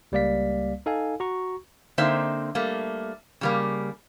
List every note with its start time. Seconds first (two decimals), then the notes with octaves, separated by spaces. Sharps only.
0.12 C#2 G3 A#3 D5 F5 B6
0.86 D#4 A4 F5 G#5
1.20 F#4 A#5 C#6
1.98 D3 A#3 C4 D#4 C5 E5
2.55 G3 A3 A#3
3.41 C#3 G3 A#3